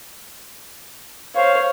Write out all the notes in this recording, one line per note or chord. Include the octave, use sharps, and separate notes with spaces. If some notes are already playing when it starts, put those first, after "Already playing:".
C5 C#5 F5